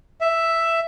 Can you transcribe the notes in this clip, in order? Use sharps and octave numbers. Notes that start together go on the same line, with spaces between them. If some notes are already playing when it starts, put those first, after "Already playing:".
E5